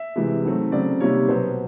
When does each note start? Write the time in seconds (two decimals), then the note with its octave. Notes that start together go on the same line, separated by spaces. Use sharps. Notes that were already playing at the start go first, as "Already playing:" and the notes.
Already playing: E5
0.16 C3 E3 G#3
0.44 D#3 F#3 A3 C4
0.72 C#3 F#3 A3 C4 D5
1.00 C3 D#3 G3 A#3 C#5
1.29 B2 F#3 B3 C5